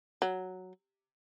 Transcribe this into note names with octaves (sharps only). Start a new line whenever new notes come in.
F#3